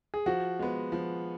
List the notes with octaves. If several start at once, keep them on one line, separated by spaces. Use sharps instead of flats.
G#4
F3 F#4
G#3 B3
F3